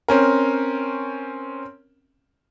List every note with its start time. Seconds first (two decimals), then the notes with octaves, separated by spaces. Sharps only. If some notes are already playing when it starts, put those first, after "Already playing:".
0.08 C4 C#4 A#4